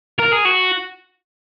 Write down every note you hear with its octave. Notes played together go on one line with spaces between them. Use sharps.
A#4
G#4
F#4